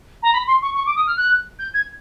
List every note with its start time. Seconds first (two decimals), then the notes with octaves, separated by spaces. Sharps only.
0.22 A#5
0.33 B5
0.47 C6
0.62 C#6
0.75 C#6
0.86 D6
0.96 D#6
1.07 F6
1.16 F#6
1.59 G6
1.74 G#6